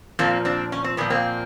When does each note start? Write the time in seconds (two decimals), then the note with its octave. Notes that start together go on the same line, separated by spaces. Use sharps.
0.19 A#2 F3 A#3 C4
0.45 C4 D4
0.72 C#4
0.84 C4
0.97 A#2 F3 B3
1.10 A#3 C4